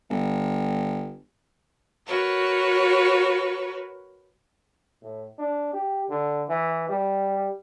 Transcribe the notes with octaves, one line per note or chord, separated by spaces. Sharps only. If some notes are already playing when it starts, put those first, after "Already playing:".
G1
F#4 A#4 B4 C#5
A2
D4
G4
D3
E3
G3